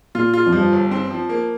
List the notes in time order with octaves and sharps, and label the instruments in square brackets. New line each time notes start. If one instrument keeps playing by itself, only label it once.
[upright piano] A#2 [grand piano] F4
[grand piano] F4
[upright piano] F2
[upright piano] G2 [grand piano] F3
[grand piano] G1
C4
F3
A#3